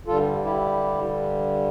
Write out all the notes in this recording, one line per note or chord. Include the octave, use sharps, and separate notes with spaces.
G2 D3 G3 F4 A4
E4 G4